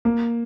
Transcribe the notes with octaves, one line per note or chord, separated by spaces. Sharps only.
A#3